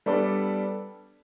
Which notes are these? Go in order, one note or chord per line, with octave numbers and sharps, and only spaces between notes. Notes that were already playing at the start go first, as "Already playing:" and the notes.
G3 B3 D4 A4 D5